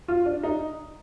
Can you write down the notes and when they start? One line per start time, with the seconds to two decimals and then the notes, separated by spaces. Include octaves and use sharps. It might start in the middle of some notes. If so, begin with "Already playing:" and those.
0.08 F4
0.26 D4
0.43 D#4